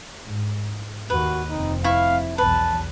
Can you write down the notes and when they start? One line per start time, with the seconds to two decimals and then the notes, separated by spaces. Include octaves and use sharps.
0.24 G#2
1.10 D#2 F#4 B4
1.48 F1 C4 D#4
1.84 E4 F5 C#6
2.38 B1 E2 B4 A5